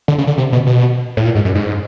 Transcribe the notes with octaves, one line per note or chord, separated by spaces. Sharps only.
D3
C#3
D3
C3
B2
B2
A2
A#2
G#2
F#2
G#2